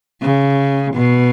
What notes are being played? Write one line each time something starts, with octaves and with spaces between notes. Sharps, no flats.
C#3
B2